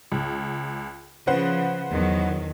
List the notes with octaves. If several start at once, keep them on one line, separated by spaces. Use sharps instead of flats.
C#2
C#3 F3 B4 C5 F#5
E2 D#3 F#3